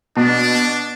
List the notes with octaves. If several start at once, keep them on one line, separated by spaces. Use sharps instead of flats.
B2 D4